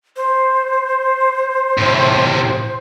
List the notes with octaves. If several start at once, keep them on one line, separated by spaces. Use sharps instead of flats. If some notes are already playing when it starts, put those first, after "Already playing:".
C5
A2 C3